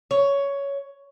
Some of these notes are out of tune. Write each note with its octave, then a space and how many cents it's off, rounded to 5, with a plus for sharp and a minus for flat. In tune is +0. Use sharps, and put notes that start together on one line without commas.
C#5 +10